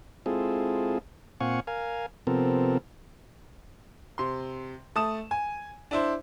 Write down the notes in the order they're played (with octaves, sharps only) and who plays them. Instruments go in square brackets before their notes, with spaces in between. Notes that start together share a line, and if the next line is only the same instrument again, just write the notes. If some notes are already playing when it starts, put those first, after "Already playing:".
[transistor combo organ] G#3 C4 E4 F4 G#4 A4
A#2 C4 F5 F#5 G#5 C#6
A#4 F5 G#5
C3 F3 B3 C4 A4 A#4
[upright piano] C3 C6
A3 A5 D#6 E7
G#5
D4 E4 C5